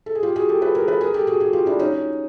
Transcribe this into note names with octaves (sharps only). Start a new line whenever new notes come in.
A4
G#4
F4 G4
F#4 G#4
G4 A4
A4 B4
G#4 A#4
A4 B4
G#4 A#4
G4 A4
F#4 G#4
F#4 G#4
F4 G4
D4 E4
C#4 D#4